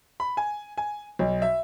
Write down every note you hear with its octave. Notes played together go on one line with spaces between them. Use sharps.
B5
G#5
G#5
B1
E5